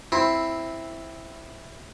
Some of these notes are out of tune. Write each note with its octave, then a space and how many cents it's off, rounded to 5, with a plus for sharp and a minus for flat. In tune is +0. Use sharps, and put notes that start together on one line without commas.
C4 +5 E4 +0